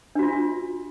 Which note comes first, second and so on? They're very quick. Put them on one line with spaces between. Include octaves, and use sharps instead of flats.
D4 F#4 F4